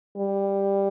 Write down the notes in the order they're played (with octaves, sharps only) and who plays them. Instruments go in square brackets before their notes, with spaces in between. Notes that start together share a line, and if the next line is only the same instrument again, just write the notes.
[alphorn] G3